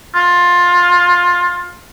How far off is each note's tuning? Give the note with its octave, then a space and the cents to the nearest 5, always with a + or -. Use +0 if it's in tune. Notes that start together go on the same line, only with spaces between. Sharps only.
F4 +15